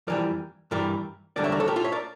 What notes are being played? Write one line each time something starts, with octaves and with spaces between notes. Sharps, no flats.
F2 E3 G3 A#4 D5
G2 E3 G3 A#4 D5
E2 D3 G3 A#4 D5
C#5 E5
A#4 D5
A4 C#5
G4 A#4
F4 A4
C#5 E5
A#4 D5